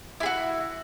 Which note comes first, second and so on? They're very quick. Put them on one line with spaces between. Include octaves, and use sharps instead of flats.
E4 G#4 F#4